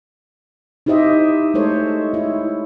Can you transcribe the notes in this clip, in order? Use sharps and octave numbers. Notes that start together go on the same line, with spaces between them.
D#4 E4 G4 C5 D#5 E5
G#3 A3 A4 C5 C#5
E4